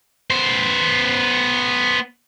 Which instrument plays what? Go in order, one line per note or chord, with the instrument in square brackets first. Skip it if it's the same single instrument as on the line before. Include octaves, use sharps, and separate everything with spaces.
[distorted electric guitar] B3 C5